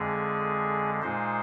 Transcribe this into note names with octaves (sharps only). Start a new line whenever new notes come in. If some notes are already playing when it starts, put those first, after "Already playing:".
Already playing: F2 D3 G#3 G#4
A#2 G#3 D#4 C5